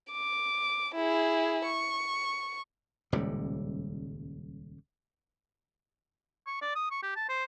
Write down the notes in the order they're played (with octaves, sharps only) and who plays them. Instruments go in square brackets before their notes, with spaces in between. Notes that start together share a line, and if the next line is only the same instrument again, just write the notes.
[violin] D6
E4 G#4
C#6
[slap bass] D#1 C#2 A2 G3
[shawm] C#6
D5
D#6
C#6
G4
A5
C5